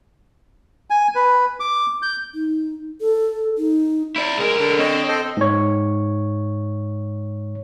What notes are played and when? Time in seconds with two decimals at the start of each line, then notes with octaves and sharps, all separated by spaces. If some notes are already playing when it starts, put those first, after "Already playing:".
0.90 G#5
1.15 B4
1.60 D6
2.02 G6
2.34 D#4
3.01 A4
3.58 D#4
4.16 E4 D5
4.38 B1 G#3 A#4
4.58 D3
4.79 C4 C#5 D#5
5.08 A4 C5 D#5
5.37 G#2 C#5